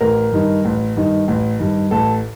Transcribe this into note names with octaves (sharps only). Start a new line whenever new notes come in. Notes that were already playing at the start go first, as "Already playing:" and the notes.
A1 A#4
G2 D#3
A1
G2 D#3
A1
G2 D#3
A1 A4